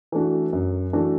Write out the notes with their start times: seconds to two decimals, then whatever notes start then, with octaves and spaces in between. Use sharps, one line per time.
0.12 E3 A3 D4 F#4
0.53 F#2
0.93 E3 A3 D4 F#4